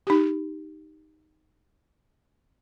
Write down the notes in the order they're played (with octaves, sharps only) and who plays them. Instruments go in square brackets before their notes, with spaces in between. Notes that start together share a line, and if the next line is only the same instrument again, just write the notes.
[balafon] D#4 G4